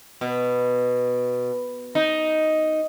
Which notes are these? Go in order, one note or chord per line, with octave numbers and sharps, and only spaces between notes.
B2
D#4